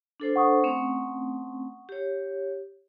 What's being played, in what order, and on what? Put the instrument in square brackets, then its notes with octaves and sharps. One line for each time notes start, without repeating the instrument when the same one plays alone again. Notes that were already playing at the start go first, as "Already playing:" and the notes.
[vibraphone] D4 A4 C5
[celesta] F#5 C#6 D#6
[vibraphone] A3 C4 C#4
G4 C#5